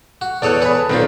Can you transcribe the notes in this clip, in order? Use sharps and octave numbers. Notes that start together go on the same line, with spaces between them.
F#4
E2 A4 C#5 D5 D#6 F#6
B4 C#5 G#5 B5
A5
B1 A#2 D#3 C4 F4